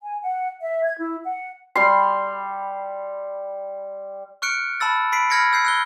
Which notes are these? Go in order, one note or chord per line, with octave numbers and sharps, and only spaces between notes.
G#5
F#5
E5
G#6
E4
F#5
G3 C6
C#6 F6 F#6 C#7 D7
A5 B5 E6 A6
B5 B6 C7 D7
B5 E6 F6 G#6 A#6 C#7
E6 G6 C7
E6 F#6 G7